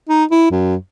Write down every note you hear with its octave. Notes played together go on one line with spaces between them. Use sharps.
D#4
E4
F#2